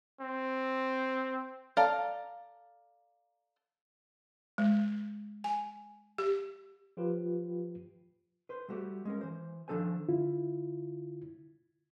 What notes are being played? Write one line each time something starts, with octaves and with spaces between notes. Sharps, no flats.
C4
A4 D5 F5 A#5
G#3
G#5
G4
F3 F4 G4 B4
B4 C5
G3 A3 F#4 G4
G#3 C#4 A#4
E3 C5
D#3 F3 D4 A4 C5 G#5
D3 E4 F4